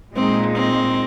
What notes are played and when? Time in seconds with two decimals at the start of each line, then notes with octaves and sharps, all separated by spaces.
0.15 A#2 G#3 C4 D#4
0.55 C4